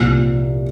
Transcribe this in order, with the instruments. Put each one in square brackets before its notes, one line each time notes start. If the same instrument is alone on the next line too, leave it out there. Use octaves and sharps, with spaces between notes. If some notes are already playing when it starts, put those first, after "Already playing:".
Already playing: [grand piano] C2 A#2 F3